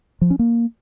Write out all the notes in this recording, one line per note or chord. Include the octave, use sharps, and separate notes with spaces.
F3
C#4
A#3